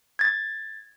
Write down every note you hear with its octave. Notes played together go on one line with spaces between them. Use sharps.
G#6 A6